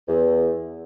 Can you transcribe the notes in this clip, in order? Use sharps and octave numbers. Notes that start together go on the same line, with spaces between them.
E2